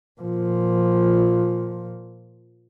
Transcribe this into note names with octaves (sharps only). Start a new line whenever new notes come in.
A#2 F3